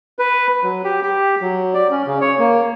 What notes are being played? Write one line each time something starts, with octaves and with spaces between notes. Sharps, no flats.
B4
F#3
G4
G4
F#3
D5
C#4
C#3
C#5
A#3